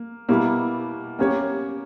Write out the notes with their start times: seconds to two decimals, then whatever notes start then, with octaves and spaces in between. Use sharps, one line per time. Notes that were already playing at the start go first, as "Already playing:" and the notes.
Already playing: A#3
0.29 B2 G3 A#3 E4
1.19 A#3 C#4 G4 C#5